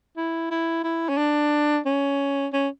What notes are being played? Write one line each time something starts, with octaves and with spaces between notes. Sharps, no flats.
E4
E4
E4
C#4
D4
C#4
C#4